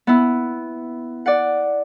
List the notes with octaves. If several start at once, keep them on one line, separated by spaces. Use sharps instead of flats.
B3 E4
D5 F#5